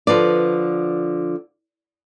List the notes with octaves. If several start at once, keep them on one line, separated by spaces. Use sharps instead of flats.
D3 F3 B4 D5